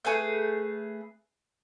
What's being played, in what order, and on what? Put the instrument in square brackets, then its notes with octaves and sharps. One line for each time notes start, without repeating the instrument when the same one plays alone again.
[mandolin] A3 G#4 B4 G6